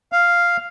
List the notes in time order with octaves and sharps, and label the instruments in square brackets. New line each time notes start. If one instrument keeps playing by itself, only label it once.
[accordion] F5